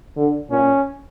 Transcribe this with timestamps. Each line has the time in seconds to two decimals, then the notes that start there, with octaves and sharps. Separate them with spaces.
0.17 D3
0.51 A#2 C#4